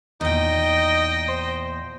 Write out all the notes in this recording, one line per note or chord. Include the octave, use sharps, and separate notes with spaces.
E2 A#2 D#4 D#5 G5
C5